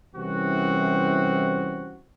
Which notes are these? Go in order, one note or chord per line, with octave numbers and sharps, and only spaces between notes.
C2 E3 C4 C#4 F#4